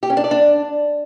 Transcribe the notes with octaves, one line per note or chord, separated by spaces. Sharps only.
G4
C#4
D4
D5
D4